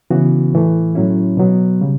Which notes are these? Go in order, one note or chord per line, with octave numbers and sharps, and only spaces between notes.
C#3 E3 B3 F#4
A2 E3 A3
A2 F#3 C#4 E4
B2 F#3 B3
C#3 G3